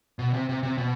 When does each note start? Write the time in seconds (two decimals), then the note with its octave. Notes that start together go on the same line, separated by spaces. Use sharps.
0.19 B2
0.34 C3
0.49 C3
0.63 C3
0.78 B2